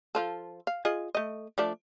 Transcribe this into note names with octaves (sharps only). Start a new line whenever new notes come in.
F3 F4 A4
F5
F4 G#4 D#5
A3 D#5
F3 A3 D4